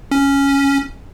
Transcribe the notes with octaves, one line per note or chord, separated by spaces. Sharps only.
C#4